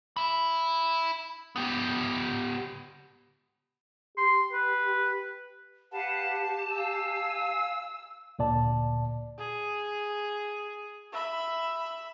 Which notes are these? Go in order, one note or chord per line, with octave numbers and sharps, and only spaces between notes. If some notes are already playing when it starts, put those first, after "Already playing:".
E5 B5
B3 G4
G4 C6
B4
G4 B4 F5 F#5 A5
F5 G#5 E6
D2 A#2 D5 A5
G#4
E5 B5